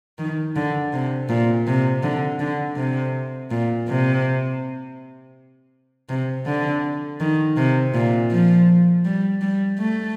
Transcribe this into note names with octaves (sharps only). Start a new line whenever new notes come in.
D#3
D3
C3
A#2
C3
D3
D3
C3
A#2
C3
C3
D3
D#3
C3
A#2
F3
G3
G3
A3